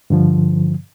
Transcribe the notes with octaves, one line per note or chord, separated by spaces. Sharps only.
G2 D3 F3